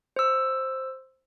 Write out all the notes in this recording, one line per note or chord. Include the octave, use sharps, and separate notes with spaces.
C5 E6